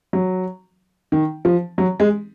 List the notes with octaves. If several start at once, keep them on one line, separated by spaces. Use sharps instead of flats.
F#3
D#3
F3
F#3
G#3